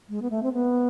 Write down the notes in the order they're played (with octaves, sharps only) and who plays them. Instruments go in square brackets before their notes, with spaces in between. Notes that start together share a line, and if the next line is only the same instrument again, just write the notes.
[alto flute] G#3
B3
A3
C4
B3